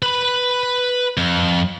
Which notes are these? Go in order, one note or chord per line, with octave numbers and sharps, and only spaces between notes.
B4 B5
F2